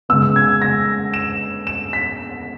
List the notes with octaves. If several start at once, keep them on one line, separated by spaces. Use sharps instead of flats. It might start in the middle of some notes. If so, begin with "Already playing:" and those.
C#3 G#3 B3 E6
G#6
A#6
E7
E7
B6